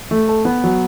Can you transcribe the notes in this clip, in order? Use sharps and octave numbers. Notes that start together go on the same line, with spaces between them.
A3
A4
B3
F#3